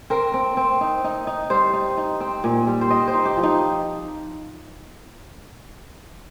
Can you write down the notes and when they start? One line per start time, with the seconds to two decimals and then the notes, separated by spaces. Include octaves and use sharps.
0.10 C4 A#4
0.34 C4
0.57 C4
0.81 D#4
1.04 D#4
1.27 D#4
1.50 G3 C5
1.73 D#4
1.97 D#4
2.20 C4
2.44 A#2
2.67 G3
2.81 C5
2.90 C4 D#5
3.08 C5
3.13 D#4
3.25 G4
3.37 F3
3.43 D#4